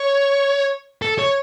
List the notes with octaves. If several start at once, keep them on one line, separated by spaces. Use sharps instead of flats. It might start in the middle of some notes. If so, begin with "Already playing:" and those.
Already playing: C#5
A4
C#5